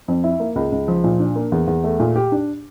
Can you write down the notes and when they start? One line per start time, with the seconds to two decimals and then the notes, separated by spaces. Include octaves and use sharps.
0.08 F2
0.24 E4
0.40 A#3
0.56 C#2
0.72 C#2
0.88 F3
1.04 A#2
1.20 D4
1.36 A#3
1.52 E2
1.67 E2
1.84 A3
2.00 A#2
2.16 G4
2.32 D4